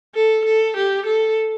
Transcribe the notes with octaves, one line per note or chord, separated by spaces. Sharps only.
A4
A4
G4
A4